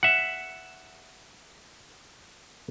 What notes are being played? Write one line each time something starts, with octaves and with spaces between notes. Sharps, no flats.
E5 F#5